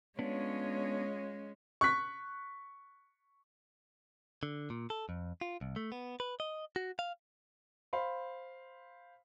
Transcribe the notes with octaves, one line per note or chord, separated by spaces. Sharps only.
G#3 B3 C#4 D4 F4 C#5
C#6 F#6 B6
D3
A#2
A4
F2
F4
C2
A3
B3
B4
D#5
F#4
F5
C5 F5 B5 C6